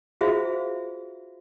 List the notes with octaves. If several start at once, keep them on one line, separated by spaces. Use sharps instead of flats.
F4 F#4 G#4 C5 E5 F5